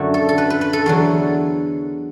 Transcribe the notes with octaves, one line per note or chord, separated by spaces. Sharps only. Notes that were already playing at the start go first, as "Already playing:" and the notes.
Already playing: F#2 D3 A3 F#4
A4
A4
B4
B4
B4
A4
E2 D3 F#3